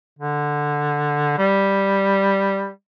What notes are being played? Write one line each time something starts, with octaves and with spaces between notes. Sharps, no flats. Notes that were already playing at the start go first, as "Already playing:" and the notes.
D3
G3